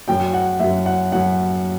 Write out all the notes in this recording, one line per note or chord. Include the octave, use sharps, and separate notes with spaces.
F#2 F#3 G5
F#5
F#2 F#3 E5
F#5
F#2 F#3 F#5